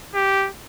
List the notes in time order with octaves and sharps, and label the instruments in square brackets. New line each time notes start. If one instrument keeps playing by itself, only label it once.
[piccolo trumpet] G4